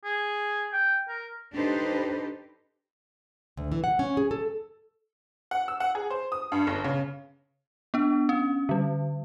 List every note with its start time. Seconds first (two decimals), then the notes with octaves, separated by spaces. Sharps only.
0.04 G#4
0.72 G5
1.09 A#4
1.53 D4 D#4 G4 A4 B4 C5
3.57 D2
3.72 E3
3.84 F#5
3.99 C#4
4.17 G#4
4.31 A4
5.51 F#5
5.68 E6
5.80 F#5
5.95 G#4
6.10 C5
6.32 D#6
6.52 G2
6.67 G1
6.84 C#3
7.94 B3 D4
8.29 C#4
8.69 D3 G3